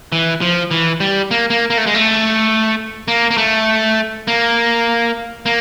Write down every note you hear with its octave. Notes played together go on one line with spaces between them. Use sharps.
E3
F3
E3
G3
A#3
A#3
A#3
A3
G#3
A3
A#3
A#3
A3
A#3
A#3